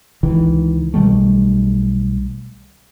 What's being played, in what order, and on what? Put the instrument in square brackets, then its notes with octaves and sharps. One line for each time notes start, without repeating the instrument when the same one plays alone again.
[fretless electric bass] C#2 D#3 E3
B1 D#3 G3 A3